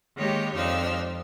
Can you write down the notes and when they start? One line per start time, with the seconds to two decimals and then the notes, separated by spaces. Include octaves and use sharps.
0.17 D#3 G#3 A#3 G4 C#5
0.55 F2 F3 D4 D#4 E6 F6